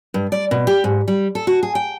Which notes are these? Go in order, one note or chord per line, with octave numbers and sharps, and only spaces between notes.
G2
D5
B2
G4
G#2
G3
A4
F#4
G#4
G5